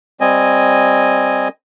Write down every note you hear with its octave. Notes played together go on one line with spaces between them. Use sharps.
G3 C4 D#5 G#5